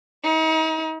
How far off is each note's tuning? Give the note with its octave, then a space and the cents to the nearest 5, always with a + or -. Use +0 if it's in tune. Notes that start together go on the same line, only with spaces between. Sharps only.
D#4 +40